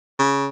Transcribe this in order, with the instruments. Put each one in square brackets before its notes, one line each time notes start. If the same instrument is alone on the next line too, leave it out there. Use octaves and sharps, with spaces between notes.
[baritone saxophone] C#3